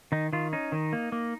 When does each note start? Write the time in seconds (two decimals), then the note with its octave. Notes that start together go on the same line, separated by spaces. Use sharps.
0.12 D#3 D#4
0.33 D#3 F4
0.53 C#4 D#4
0.72 D#3
0.93 A#3
1.12 A#3